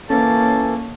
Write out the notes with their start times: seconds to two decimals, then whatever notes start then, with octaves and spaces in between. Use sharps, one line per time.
0.10 E3 A#3 C#4 A4 A5